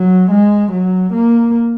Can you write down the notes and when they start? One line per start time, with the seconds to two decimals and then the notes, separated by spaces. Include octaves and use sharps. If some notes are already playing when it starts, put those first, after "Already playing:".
Already playing: F#3
0.31 G#3
0.72 F#3
1.13 A#3